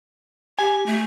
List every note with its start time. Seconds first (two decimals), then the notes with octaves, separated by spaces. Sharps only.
0.59 G4 G#5
0.86 A3